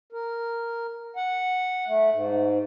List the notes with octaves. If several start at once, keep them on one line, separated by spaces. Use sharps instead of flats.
A#4
F#5
A3
G#2